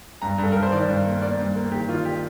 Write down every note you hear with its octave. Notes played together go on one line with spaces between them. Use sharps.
G2 A#5
G2 A4
G2 A#4
C5
D#3 D5
G2
A#3
A#3 D5
G2
A#3
D#3 G4
D#3 F4
G4